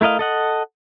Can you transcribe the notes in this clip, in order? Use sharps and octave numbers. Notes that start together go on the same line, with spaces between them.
A3 E4 A#4 D#5 F5
A4 D#5 F#5